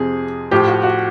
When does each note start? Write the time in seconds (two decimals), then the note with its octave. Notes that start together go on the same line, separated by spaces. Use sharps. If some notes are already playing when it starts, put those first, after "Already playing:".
Already playing: F2 C3 F3 G#4
0.51 A2 F3 G4
0.67 F#4
0.83 F#4